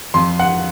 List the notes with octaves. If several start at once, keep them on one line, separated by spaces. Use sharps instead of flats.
F2 C6
F#5